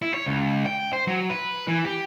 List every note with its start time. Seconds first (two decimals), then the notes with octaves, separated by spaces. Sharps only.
0.02 E4
0.14 C#5
0.26 C#2
0.66 G5
0.93 C5
1.07 F#3
1.30 B4
1.68 E3
1.85 G4